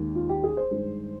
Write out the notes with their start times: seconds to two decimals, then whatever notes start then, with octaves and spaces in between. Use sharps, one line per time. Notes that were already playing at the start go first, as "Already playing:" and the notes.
Already playing: D#2 D#3 G#3
0.16 F4
0.29 G4
0.44 G#4
0.57 C5
0.71 G2 D#3 G#3